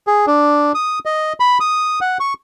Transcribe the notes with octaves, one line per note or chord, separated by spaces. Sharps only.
G#4
D4
D#6
D#5
B5
D#6
F#5
C#6